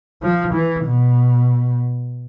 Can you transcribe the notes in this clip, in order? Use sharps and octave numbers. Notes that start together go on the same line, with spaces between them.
F3
E3
B2